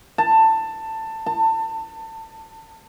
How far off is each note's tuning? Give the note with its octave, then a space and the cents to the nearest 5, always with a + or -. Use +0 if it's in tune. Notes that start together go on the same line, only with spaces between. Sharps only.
A5 +15
A5 +25